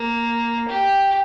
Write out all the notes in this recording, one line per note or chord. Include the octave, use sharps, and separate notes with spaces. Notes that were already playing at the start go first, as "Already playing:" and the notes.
Already playing: A#3
G4